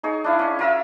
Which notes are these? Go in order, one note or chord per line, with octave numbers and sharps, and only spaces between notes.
D#4 G#4 C#5
D4 E4 F5
C#4 C#5
F4 A#4 E5